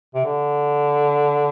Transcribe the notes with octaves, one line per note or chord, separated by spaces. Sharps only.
C3
D3